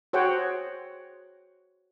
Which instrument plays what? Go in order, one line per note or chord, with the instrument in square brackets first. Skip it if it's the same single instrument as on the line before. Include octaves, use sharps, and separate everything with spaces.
[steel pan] F#4 G#4 C5 C#5 F#5 G5